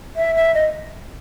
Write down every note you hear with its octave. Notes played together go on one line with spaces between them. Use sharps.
E5
E5
D#5